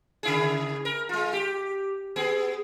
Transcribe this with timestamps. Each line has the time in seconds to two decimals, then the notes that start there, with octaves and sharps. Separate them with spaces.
0.23 C#3 E4 G#4
0.85 A#4
1.09 G#3 F4
1.33 G4
2.16 B3 G#4